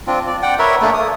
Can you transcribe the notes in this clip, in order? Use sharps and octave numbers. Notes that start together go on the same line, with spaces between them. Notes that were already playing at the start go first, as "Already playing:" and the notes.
C4 D4 F4
D5
D5 F#5 G5
A#4 B4 C#5 E5
A3 A#3 D4
D#6